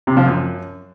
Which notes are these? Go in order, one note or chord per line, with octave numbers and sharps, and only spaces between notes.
C3
F3
F#2